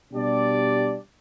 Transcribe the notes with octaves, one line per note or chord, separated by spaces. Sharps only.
B2 G3 D4 G4 D5